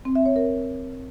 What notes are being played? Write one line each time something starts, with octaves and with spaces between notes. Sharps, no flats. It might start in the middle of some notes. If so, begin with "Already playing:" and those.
C4
E5
C#5
A#4